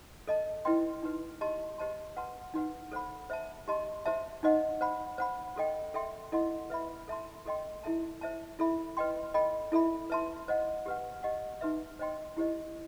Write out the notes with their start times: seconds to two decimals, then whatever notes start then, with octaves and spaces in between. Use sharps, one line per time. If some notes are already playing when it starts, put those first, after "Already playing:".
0.28 A4 D#5 A5
0.65 E4 B4 D#5 G5 C6
1.03 D#4 F#4 B4
1.41 G4 D#5 A5 C6
1.78 G4 C5 D#5 A5 C6
2.17 B4 F#5 A5 C6
2.54 D#4 F#4 B4 F#5
2.92 A4 C5 F#5 B5
3.30 C5 E5 A5
3.68 G4 D#5 A5 C6
4.05 F#4 C5 E5 A5
4.43 D#4 F#4 C5 D#5 F#5
4.81 C5 F#5 B5
5.18 C5 F#5 B5
5.56 F#4 A4 D#5 G5
5.94 A4 E5 G5 C6
6.32 E4 A4 D#5 F#5 C6
6.70 B4 E5 B5
7.08 A4 E5 A5 C6
7.45 F#4 A4 D#5 G5 C6
7.83 E4 A4 E5 A5
8.21 C5 E5 A5
8.59 E4 A4 E5 B5
8.97 B4 D#5 G5 C6
9.34 A4 D#5 G5 B5
9.72 E4 A4 E5 B5
10.10 B4 E5 A5 C6
10.48 C5 D#5 F#5
10.86 G4 B4 F#5
11.23 G4 D#5 F#5
11.61 D#4 F#4 B4 E5
11.99 C5 D#5 G5 C6
12.37 E4 G4 C5 D#5